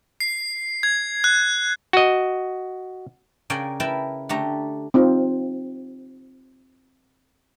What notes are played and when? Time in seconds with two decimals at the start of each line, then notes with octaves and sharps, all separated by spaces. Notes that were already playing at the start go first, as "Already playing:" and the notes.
0.20 C7
0.83 G#6
1.24 F#6
1.93 F#4 D#5
3.50 C#3 A#4 D5 G5 G#5
3.80 E4 A#4 B4 G5 A5 B5
4.29 D3 A3 G4 A#5
4.94 C4 D#4 F4